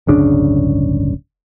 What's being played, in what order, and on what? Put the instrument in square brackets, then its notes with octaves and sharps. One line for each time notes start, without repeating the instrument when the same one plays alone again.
[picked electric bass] D1 G1 C#3 D4